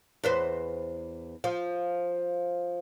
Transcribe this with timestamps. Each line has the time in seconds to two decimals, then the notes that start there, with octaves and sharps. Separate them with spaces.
0.24 E2 B4 C5
1.44 F3